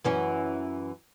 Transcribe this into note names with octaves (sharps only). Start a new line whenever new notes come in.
F#2 E3 C#4